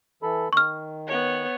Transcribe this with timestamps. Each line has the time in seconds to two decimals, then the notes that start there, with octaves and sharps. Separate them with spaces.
0.23 E3 A4 B5
0.53 D#3 C#6 F6
1.07 B3 C#5